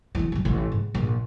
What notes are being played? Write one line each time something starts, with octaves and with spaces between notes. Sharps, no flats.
E1 E3
A1 F#3
A1 D#2
G#2
A#1